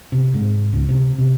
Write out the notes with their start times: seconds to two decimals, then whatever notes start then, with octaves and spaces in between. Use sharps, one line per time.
0.12 C3
0.34 G#2
0.73 C#2
0.89 C3
1.18 C3